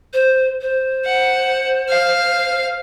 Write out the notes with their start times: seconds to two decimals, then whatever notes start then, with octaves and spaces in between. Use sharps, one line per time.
0.13 C5
0.61 C5
1.05 F#5
1.89 F5